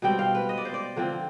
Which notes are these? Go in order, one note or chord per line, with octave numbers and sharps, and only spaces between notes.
B2 G3 C4 G5
F5
B4
D#5
D5
C5
D5
D3 F3 C4